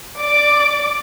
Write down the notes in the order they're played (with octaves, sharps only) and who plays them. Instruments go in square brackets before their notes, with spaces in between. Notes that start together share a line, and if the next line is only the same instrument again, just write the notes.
[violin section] D5 D6